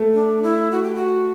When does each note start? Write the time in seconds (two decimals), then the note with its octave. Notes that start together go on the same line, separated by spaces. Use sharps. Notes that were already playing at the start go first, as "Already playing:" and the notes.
Already playing: A3
0.14 D4
0.43 E4
0.72 F#4
0.83 G4
0.95 F#4